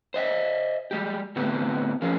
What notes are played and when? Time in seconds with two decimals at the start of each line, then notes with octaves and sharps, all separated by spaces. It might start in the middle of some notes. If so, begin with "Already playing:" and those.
0.14 C5 D#5 E5
0.91 G3 G#3 G4
1.36 A2 D3 B3 C4 G4
2.02 F3 C#4 G#4 A#4